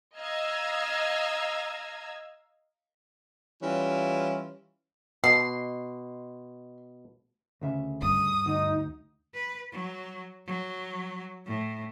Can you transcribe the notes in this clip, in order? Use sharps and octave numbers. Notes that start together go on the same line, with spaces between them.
D#5 F5 A#5 E6 G#6
E3 G3 C#4 F4
B2 C6
D2 C#3 E5
G2 D#6
D2 D#4
B4
F#3
F#3
A2